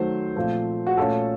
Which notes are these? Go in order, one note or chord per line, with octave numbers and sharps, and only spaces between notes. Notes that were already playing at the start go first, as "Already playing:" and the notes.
Already playing: D#3 F#3 A3 C5
A#2 F3 A3 C4
F#4
A#2 A3 C#4 A4